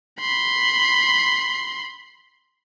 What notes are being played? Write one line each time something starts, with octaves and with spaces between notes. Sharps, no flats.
B5 C6